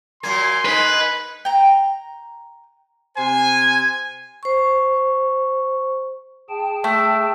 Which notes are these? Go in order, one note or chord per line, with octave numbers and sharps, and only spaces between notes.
A#2 F#3 A#3 G#5 C6
G#3 D#4 B4
G5 A#5
C3 C5 G#5
C5 C#6
G#4 G5 A5
A3